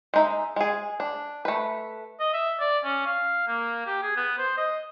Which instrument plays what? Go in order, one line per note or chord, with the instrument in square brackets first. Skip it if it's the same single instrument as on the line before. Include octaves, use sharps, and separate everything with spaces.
[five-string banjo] G#3 D#4 E5
G#3 G#4
D4
A3 B4
[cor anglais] D#5
E5
D5
C#4
F5
A#3
G4
G#4
B3
C5
D#5